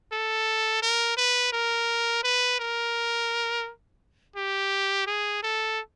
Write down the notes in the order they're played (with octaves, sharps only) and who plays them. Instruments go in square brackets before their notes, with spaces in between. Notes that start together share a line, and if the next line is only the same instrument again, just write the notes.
[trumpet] A4
A#4
B4
A#4
B4
A#4
G4
G#4
A4